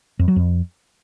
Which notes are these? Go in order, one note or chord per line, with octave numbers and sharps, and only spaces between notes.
F2
F#3
F2